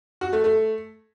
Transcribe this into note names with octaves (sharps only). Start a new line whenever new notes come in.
F#4
A3
A3